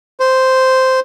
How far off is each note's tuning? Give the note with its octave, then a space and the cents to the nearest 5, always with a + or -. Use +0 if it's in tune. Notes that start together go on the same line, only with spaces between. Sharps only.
C5 -5